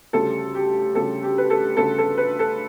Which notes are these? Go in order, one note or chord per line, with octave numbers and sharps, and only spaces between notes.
D2 C#3 G3 A4
G4
D2 C#3 G3 A4
G4
B4
A4
D2 C#3 G3 A4
A4
B4
A4